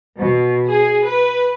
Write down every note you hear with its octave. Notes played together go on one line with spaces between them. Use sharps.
B2
G#4
B4